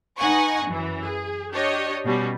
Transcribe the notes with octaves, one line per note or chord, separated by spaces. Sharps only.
D#4 B4 F#5 G#5 C#6
F#2 E3
G#4
D4 G4 C#5 D#5
B2 G3 C#4